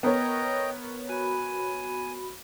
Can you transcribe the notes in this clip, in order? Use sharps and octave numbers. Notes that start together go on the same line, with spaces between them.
B3 A#4 C#5 D#5 G5 A#5
F#4 G#5 B5